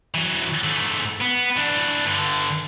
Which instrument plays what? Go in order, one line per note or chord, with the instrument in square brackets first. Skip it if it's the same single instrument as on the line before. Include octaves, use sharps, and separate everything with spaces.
[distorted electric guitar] E3 F#3
G#2 A3
B3
E3 D4
G2 D3